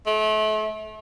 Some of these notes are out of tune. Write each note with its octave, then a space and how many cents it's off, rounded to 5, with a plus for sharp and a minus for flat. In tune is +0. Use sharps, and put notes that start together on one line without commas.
A3 -35